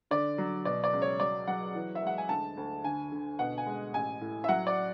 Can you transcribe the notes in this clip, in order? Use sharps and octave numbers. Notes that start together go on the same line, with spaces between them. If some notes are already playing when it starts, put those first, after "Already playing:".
D3 D5
F#3
B2 D5
D5
C#2
C#5
F#3 D5
F#3 F#5
E3
E5
G#3 F#5
G#5
D2 A5
D2
D3 G#5
D3
B2 F#5
G#5
G#3
A1 G#5
A2
E5
F#3 F#5
D5